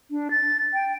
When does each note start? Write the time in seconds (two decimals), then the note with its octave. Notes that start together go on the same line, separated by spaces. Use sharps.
0.11 D4
0.31 A6
0.74 G5